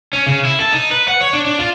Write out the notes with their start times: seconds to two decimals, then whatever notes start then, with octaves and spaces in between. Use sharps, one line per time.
0.13 C#4
0.27 C#3
0.45 E4
0.60 A4
0.73 D#4
0.91 B4
1.08 F#5
1.21 C#5
1.33 D4
1.45 D4
1.59 F4